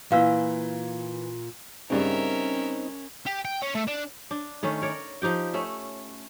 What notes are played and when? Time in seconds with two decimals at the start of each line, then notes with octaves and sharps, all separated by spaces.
0.12 A#2 E3 F5 E6
1.90 G2 C#3 C4 C#4 D#4 A#4 E5
3.26 G4
3.45 G5
3.62 C#4
3.75 A3
3.87 D4
4.31 D4
4.63 D#3 A3 C#4
4.82 A#4 C#5 D5
5.22 F3 D#4 G4 G5
5.53 A3 C#4 E5